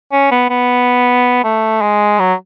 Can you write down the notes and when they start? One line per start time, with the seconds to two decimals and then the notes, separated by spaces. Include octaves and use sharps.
0.13 C#4
0.31 B3
0.50 B3
1.44 A3
1.82 G#3
2.19 F#3